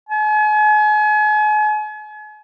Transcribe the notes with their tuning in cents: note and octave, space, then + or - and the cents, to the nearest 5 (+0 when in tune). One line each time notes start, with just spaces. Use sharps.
G#5 +40